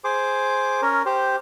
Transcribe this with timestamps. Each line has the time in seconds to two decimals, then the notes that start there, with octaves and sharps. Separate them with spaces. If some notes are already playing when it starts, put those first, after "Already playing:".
0.04 G#4 C5 D6
0.82 C#4 A#4
1.06 G4 C5